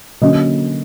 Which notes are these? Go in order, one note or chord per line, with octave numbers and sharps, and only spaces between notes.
D3 F#3 A#3 C#4 D#5